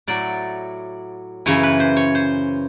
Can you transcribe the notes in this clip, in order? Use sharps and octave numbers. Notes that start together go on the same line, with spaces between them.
A2 F#3 D5
F#2 C#3 E3 C#5
B4
C5
C#5
C5